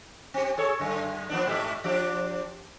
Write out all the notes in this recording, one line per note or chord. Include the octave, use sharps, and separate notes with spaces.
C4 G4
G#4 A4 C#5
F#2 D3
F3 B3 D4
G#2 A3 G4
F3 D4 G4